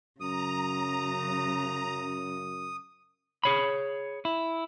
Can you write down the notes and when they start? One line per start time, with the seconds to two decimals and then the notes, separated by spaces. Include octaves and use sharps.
0.20 F#2 C#3 F#3 A#5 D#6
3.44 G#4 C#5 B5
4.25 E4